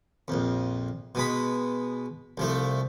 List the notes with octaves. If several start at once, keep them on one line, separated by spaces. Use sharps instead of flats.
A#1 F2
B2 G#3 B5
C2 F3 A3